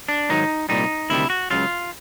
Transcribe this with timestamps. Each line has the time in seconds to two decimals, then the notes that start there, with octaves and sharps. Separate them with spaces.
0.09 D4
0.29 G#2 D#3 F#3 D#4
0.69 C2 A#2 G3 D#4
1.10 D2 C3 D#3 G3 E4
1.30 F#4
1.50 C#2 C#3 F#3 F4